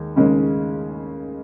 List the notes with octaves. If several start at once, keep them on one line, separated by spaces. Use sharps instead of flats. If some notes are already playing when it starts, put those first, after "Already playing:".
Already playing: D#2 G#3
D#2 C#3 G#3 C#4